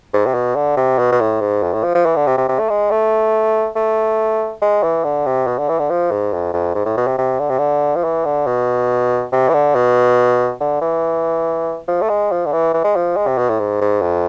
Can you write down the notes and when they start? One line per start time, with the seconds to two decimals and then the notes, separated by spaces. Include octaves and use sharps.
0.13 G#2
0.26 C3
0.34 B2
0.56 D3
0.77 C3
0.98 B2
1.12 B2
1.20 A2
1.41 G#2
1.62 F2
1.73 A2
1.84 F3
1.95 F3
2.06 E3
2.16 D3
2.27 C3
2.37 C3
2.49 C3
2.59 A3
2.69 G#3
2.91 A3
3.76 A3
4.61 G#3
4.83 E3
5.04 D3
5.26 C3
5.47 B2
5.58 D3
5.69 E3
5.79 D3
5.90 F3
6.11 G#2
6.33 F2
6.54 F2
6.75 G#2
6.86 A2
6.97 B2
7.07 C3
7.18 C3
7.39 D3
7.49 C3
7.58 D3
7.96 F3
8.04 E3
8.25 D3
8.47 B2
9.32 C3
9.49 E3
9.53 D3
9.75 B2
10.60 D3
10.81 E3
11.88 F3
12.02 A3
12.09 G#3
12.32 F3
12.46 D3
12.53 E3
12.74 E3
12.84 G#3
12.96 F3
13.16 G#3
13.27 C3
13.38 B2
13.49 A2
13.59 G#2
13.81 G#2
14.01 F2